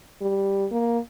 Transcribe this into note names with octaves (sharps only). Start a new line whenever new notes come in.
G3
A#3